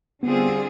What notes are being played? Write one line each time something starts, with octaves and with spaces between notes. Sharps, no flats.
D3 G3 B3 C4 F4 G#4